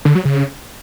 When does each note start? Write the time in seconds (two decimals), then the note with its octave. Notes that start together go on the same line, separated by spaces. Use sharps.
0.05 D3
0.15 F#3
0.25 C#3